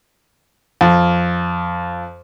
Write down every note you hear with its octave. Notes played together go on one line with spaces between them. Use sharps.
F2